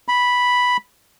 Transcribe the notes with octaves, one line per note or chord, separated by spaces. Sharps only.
B5